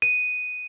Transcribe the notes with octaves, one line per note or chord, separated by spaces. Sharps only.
D#7